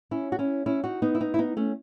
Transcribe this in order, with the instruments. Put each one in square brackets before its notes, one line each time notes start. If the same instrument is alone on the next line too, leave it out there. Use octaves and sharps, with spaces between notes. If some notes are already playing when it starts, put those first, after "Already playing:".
[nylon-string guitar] C#4 E4
F#4
C#4 E4
C#4 E4
D#4 F#4
B3 D#4
E4
B3 D#4
E4
B3 D#4
A3 C#4